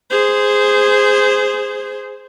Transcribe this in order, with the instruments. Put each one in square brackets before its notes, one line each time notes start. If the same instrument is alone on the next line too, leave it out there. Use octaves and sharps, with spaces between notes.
[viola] G#4 C5